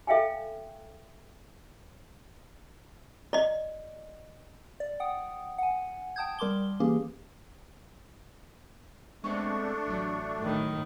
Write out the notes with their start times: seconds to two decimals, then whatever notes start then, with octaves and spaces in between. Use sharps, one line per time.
0.07 A4 E5 F5 G5 G#5
3.33 D5 D#5
4.80 D5
5.00 F#5 G5 D#6
5.58 F#5 G#5
6.16 G5 A5 D#6 G6 G#6
6.39 G3 A#4 C6 D6 G7
6.80 E3 A#3 C#4 G4 G#4
9.24 G#3 A3 B3 C4 D4 C#6
9.86 A1 F#3
10.39 A2 D#3